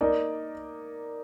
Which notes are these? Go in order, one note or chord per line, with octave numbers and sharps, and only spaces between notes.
A#3 D#4 A#4 D5